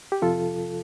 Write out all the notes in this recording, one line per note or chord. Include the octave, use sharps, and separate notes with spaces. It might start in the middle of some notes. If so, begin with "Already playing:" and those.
G4
F2 C3 F3 F4 A4